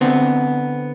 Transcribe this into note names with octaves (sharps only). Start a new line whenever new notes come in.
D3 B3 C4